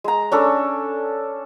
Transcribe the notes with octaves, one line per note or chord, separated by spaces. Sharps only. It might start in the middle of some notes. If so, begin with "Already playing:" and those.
G#3 A#5
C#4 D4 A4